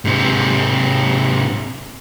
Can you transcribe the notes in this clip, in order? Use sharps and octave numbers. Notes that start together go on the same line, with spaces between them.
G#2 C3